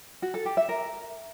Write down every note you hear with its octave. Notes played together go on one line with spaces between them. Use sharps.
F#4
A4
G4
E5
A#4